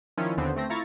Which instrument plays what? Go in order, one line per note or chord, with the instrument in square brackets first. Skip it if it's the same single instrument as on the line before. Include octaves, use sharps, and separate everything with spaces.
[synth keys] D#3 F3 C#4 E4 F4
D#2 D3 B3 C4
A3 C4 A#6
E4 F4 A#5 C#6 A6